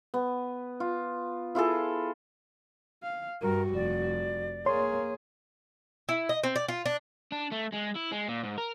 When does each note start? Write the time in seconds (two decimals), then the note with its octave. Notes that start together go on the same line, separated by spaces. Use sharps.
0.14 B3
0.80 F4
1.55 E4 F4 G#4 A4
3.03 F5
3.42 G2 G3 F#4 A#4
3.74 F1 D5
4.66 A#3 G#4 C#5 C6
6.09 E4
6.29 D#5
6.44 C4
6.56 D5
6.68 F4
6.86 D4
7.32 D4
7.51 A3
7.72 G#3
7.95 E4
8.12 G#3
8.29 A#2
8.44 G#2
8.58 A#4